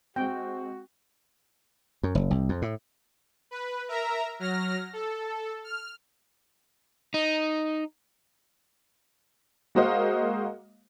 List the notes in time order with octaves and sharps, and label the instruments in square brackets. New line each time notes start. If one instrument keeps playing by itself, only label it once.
[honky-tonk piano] G#3 C4 [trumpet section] F#4 [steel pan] G5
[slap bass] F#2
F#1
C2
F2
A2
[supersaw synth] B4
A#4 E5 A#5
F#3 F6 A#6
A4
F6
[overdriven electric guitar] D#4
[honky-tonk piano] G#3 A#3 F#4 C5 D#5 F5